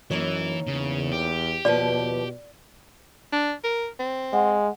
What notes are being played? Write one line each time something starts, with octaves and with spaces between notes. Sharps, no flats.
F#2 E3 A#3 D#4 C#5
E2 C#3
G4
D#2 B2 F3 B4 D5
D4
A#4
C4
G#3 F#5